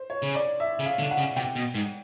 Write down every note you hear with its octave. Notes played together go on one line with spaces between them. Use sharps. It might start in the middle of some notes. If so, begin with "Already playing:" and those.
Already playing: C5
C#5
C#3
D5
E5
C#3
F5
D3
F#5
C#3
C3 G5
B2
G#2